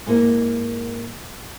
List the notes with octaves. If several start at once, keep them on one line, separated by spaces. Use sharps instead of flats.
G#2 A#3 E4 A#4